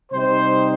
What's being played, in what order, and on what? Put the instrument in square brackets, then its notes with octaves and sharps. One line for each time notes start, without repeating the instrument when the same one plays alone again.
[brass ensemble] C3 G3 C4 D#4 C5